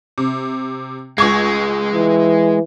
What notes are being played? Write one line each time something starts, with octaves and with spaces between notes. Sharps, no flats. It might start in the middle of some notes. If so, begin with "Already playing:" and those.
C3
C#2 G#3 C#6 G#6
E3